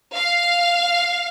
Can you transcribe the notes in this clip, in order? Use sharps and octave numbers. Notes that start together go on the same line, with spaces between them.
F5